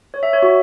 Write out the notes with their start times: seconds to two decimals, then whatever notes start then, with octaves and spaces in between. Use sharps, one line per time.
0.14 C#5
0.23 E5
0.33 C#5
0.42 F#4